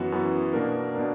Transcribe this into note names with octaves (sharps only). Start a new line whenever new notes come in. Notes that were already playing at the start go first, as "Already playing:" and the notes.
Already playing: F#2 E3 B3 F#4
F#2 E3 B3 F#4
B2 A#3 D4 A#4
B2 A#3 D4 A#4